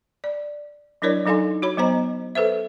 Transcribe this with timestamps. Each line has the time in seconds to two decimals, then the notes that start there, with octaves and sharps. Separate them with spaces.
0.24 D5
1.02 F#3 D4 E4 A#4 C#5 D5
1.26 F#3 D#4 A4 F5 G#5 C6
1.62 F#4 C#5 B5
1.78 F#3 B3 C5 D#5 A#5
2.35 A4 B4 C5 E5